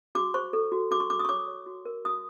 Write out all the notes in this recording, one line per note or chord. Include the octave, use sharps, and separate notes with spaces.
F#4 D6
C5 C#6
A4
F#4
F#4 D6
C#6
F#4 D6
D#6
C#6
C#5 D6
C#5
F#4
A#4
F#4 D#6